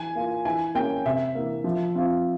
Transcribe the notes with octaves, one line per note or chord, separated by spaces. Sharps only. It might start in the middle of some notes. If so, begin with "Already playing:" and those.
Already playing: E3 G#5
A#3 F4
E3 G#5
A#3 C#4 G5
C3 E5
E3 A#3
F3
C4 F4